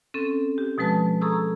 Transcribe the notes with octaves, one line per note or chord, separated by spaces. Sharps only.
C4 C#4 A4 A6
G4
B2 F3 G#3 B4 A5
G#4 A4 A#5 C#6 D#6 E6